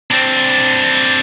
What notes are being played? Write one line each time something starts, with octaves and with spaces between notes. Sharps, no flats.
C4 D4